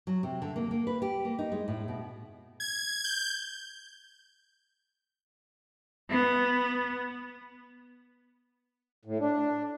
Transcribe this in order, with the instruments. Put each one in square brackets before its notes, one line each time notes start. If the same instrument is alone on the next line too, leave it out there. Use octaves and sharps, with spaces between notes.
[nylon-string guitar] F#3
C3
D3
A#3
A#3
B4
G4
A#3
D#4
G#3
A2
B2
[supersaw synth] G#6
G6
[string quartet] B3
[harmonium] A2
D4